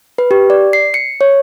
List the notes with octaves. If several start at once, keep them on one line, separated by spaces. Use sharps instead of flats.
B4
G4
D5
C7
C#7
C#5